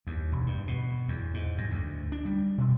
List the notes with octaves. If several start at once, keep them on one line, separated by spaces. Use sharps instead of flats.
D#2
E1
G2
B2
E2
G#2
F#2
D2
D4
G3
B2